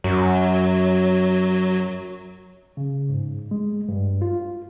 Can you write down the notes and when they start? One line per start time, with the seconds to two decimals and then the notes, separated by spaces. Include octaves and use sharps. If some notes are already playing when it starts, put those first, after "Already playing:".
0.04 F#2 F#3
2.77 C#3
3.10 G#2
3.51 G#3
3.89 G2
4.22 F4